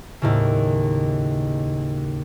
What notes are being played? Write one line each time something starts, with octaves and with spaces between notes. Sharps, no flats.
D#2 A2 C#3